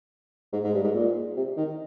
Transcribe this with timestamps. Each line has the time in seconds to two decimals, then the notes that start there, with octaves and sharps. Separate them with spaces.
0.52 G#2
0.63 G#2
0.73 G2
0.83 G#2
0.94 A#2
1.36 C3
1.57 D#3